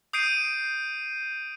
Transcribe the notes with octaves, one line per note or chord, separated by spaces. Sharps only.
D#6 G6 C7 D7 D#7